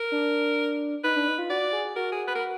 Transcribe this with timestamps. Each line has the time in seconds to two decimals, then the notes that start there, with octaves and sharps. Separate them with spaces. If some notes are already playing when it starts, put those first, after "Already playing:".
Already playing: A#4
0.12 D4
1.04 D#4 B4
1.16 D4
1.28 D#4
1.39 F4
1.50 F#4 D5
1.73 G#4
1.96 F#4 A#4
2.12 G#4
2.28 B4
2.35 A#4